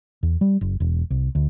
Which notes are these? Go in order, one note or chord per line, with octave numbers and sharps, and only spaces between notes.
E2
G3
F#1
E1
C2
D2